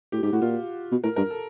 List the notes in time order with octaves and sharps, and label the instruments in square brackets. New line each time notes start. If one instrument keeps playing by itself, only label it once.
[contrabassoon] A2 [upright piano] G4
[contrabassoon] G#2 [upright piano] G4
[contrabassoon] A2 [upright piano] F#4
[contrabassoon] A#2 [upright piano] F4
[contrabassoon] B2
[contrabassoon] A2 [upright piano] A#4
[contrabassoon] G2 [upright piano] A#4
[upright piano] A4